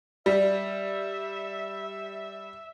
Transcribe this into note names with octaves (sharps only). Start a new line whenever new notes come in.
G3 E5